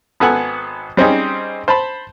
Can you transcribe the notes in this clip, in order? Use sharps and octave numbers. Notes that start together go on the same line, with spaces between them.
G#1 B3 A4 F#5 G#5
G3 C4 C#4 D#4 G#4
C5 A5 B5